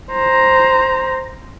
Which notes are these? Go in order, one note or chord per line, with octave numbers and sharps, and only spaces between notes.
C5 A#5